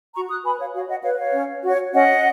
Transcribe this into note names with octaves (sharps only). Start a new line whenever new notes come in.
F#4 A#5 C#6
D#6 F#6
B4 G#5 B5
C#5 F5
F#4 C#5 F5
D#5 F#5
B4 C#5 F5
C#5 F5
C#4
F#4 C#5
C#4 D#5 F#5